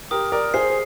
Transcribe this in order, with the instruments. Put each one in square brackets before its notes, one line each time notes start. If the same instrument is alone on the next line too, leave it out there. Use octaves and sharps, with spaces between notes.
[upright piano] G4 A#4 [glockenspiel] D#6
[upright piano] A#4 D5
[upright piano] G#4 C5 [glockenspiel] C7